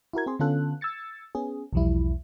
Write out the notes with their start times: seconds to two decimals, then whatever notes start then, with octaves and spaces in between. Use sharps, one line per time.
0.13 E4 F#4 A#4 G#6
0.26 C4 G#4 C6
0.39 D3 B3 C#4 F4 A4 F#6
0.81 E6 G#6 A6 C#7
1.35 B3 C#4 G#4
1.73 B1 E2 F3 G3 E4